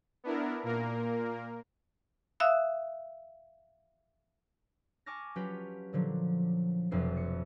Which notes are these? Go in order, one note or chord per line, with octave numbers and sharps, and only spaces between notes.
B3 D4 E4 A#4
A#2 A#3 A#4
E5 F5 D#6 E6 F#6
G#5 A5 C#6 D6 F6 A#6
F#3 C#4 F4 G4 B4
A#2 D3 F3 F#3
F1 F2 B2 F#3 D4 C7
C#7